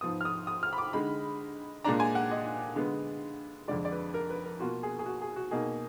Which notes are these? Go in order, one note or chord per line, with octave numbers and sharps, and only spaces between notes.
G#2 F3 B3 D#6
F6
D#6
D#6
F6
B5
D6
D3 G#3 D#4 B5
A#2 G#3 D4 A#5
G#5
F#5
D#5
D3 G#3 B3
F2 D3 G#3 D5
D5
B4
A#4
B4
A#4
B2 A#3 F4 F#4
G#4
G#4
F#4
G#4
F#4
B2 A#3 D#4 G#4